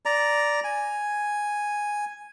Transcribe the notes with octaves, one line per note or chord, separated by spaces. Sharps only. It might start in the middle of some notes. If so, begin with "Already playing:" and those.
D5 A#5
G#5